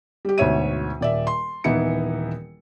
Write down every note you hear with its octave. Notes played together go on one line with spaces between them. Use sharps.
G3 G4
D2 G#2 B2 C#5 E5 D#7
D#1 D5 E5
C6
D#1 E3 B3 D#4 E4 C#7